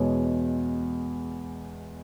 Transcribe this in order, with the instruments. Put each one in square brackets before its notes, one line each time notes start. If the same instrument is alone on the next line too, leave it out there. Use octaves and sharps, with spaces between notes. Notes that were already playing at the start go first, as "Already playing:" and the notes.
Already playing: [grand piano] E2 B2 G#3 C#5